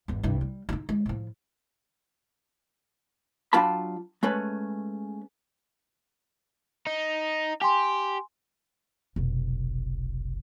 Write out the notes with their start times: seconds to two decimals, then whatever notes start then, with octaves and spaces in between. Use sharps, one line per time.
0.08 G#1 E2
0.23 C2 G2
0.41 G3
0.69 D4 D#4
0.89 G#3
1.06 A2 F3
3.53 F#3 D4 F4 G5 A5 B5
4.23 G#3 A3 C#4 B4
6.87 D#4
7.61 G4 G#5 C6
9.16 F1 B1